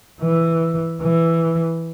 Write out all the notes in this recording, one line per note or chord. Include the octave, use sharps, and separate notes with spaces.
E3
E3